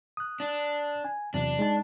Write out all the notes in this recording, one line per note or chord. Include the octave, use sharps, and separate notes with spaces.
D#6 F#6
D4
G#5
E2 C3 F#3 D4
G#3 D#4 A5